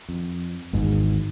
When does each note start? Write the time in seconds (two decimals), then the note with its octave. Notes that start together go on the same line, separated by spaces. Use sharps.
0.09 F2
0.73 G#1 E2 G#2